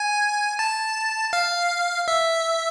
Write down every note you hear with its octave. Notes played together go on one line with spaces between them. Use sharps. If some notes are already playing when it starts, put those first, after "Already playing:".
Already playing: G#5
A5
F5
E5